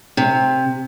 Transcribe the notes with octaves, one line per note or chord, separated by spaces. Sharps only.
C3